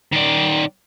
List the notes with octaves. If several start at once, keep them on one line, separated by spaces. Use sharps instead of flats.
D#3 D5